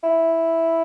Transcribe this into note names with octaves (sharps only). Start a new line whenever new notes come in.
E4